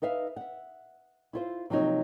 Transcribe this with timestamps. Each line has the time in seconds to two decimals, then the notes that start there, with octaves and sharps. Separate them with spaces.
0.02 D#4 B4 E5 F5
0.36 E5 F#5
1.33 E4 F4 C5
1.70 C3 F3 F#3 A#3 D#4 C#5